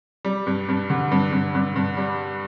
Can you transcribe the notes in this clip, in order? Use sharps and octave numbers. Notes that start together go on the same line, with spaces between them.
G3
G2
G2
D3
G2
G2
G2
G2
G3